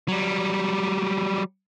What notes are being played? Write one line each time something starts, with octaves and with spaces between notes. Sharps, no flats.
F#3 G3